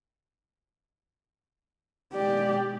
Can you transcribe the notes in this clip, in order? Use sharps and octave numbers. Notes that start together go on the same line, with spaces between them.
B2 G#3 G4 D5